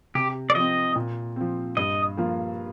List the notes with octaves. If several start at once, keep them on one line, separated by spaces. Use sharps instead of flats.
C3 G4
D5
F3 C4 D#5
A#2
F3 C4
G2 D#5
F3 A#3 F4